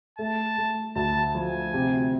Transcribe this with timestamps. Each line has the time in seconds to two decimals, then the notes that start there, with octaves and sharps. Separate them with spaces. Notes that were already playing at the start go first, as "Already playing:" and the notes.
0.19 A3 A5
0.58 A3
0.96 D2 A5
1.35 F3 G#5
1.74 C3